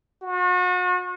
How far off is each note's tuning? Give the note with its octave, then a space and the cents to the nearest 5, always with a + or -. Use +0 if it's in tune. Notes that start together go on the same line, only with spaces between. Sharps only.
F#4 -40